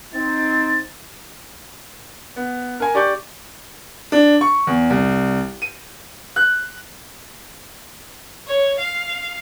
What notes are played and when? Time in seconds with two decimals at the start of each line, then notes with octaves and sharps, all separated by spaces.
0.14 C4 D#4 A6
2.36 B3
2.80 A#4 G#5
2.94 G4 D5 C#6 D6 G6
4.12 D4
4.41 C#6
4.67 E2
4.90 C2
5.62 D#7
6.36 F#6
8.47 C#5
8.79 F5